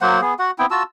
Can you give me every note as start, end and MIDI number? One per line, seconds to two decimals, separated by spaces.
0.01 0.21 54
0.01 0.21 58
0.01 0.21 72
0.01 0.21 78
0.22 0.34 59
0.22 0.34 68
0.39 0.51 66
0.39 0.51 78
0.59 0.66 59
0.59 0.66 60
0.59 0.66 64
0.59 0.66 79
0.71 0.83 65
0.71 0.83 66
0.71 0.83 81
0.71 0.83 88